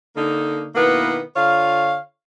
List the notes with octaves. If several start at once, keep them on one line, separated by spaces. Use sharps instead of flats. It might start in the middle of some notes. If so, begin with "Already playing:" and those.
D3 A#3 D#4
B2 D#3 A#3 B3 E4 B4
D3 F4 C#5 F5